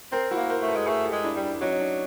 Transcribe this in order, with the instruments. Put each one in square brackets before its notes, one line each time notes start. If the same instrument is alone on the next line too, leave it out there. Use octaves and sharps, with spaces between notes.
[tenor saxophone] C4 [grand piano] A#4 C5
[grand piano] E4 F#4
[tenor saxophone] A#3
[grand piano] A#4 C5
[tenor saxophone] A3
[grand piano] A4 B4
[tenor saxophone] G#3
[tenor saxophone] A3 [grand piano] G#4 A#4
[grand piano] G4 A4
[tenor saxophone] G#3
[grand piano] D4 E4
[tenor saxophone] G3
[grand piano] D4
[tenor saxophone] F#3 [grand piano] C#4 D#4
[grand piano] D#4
D4